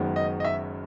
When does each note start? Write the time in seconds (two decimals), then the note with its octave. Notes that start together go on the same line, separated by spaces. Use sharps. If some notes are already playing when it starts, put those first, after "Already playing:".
Already playing: F#1 F#2 D#3 G#3 B3
0.16 D#5
0.40 D#5
0.45 E5